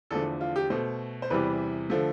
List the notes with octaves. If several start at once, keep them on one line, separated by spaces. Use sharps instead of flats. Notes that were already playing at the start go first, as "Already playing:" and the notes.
E2 D3 F3 A3 A4
F4
G4
B2 A3 C5
C5
E2 C3 E3 G3 B4
D3 F3 A3